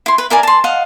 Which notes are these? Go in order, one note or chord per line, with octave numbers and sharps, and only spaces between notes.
E4 C6
B4
E4 A#4 D5 G#5
A5 C6
D#5 F5 F#5